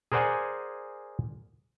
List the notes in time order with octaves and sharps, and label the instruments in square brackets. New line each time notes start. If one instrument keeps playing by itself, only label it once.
[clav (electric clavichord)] G#4 A#4 C5 D5 F#5 G#5